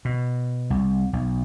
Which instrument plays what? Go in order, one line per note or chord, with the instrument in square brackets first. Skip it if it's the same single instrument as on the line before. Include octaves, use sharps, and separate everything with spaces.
[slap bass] B2
C2
B1